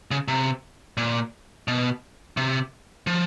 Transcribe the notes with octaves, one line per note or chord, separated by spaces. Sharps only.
C#3
C3
A#2
B2
C3
F3